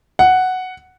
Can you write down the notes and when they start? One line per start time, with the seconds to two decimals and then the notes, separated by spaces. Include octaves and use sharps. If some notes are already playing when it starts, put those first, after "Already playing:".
0.19 F#5